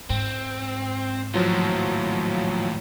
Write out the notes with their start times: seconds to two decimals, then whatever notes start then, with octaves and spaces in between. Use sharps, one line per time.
0.10 G#2 C4
1.34 D#2 A2 F3 F#3 F4